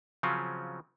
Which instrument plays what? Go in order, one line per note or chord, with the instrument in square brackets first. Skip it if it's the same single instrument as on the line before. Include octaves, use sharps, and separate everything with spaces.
[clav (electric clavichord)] C#3 F3 F#3 C4 C#4 F4